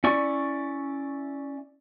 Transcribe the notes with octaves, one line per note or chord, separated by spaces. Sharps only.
C#4 E4 D5 C#6